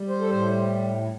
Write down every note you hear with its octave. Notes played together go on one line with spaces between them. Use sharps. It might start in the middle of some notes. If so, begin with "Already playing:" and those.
Already playing: G3
C5
A4
A2 C5